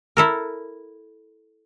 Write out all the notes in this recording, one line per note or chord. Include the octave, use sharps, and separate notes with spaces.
E4 A4 A#4